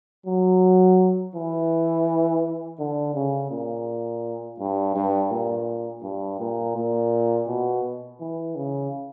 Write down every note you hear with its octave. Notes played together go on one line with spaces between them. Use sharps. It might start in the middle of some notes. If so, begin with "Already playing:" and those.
F#3
E3
D3
C#3
A#2
G2
G2
A#2
G2
A#2
A#2
B2
E3
C#3